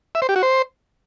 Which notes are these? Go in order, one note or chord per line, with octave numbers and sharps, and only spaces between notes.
E5
C5
G4
F#4
C5